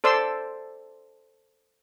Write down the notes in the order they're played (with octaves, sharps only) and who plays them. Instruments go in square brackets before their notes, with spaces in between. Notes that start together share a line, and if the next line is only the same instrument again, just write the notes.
[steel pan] A4 C5 D5 C6 E6